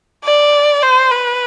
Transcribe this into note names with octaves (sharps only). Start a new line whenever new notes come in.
D5
C5
B4